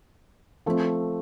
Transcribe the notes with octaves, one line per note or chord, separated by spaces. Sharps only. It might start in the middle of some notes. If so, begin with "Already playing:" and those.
F3 A3 C4